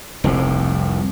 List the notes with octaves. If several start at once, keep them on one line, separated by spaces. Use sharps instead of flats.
F1 C2 A2